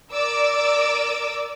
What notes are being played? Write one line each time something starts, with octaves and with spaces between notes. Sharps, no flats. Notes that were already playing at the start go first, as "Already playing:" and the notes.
A#4 D5 D6 E6